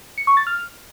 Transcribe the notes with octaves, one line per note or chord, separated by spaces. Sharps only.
C#7
C#6
A6
F6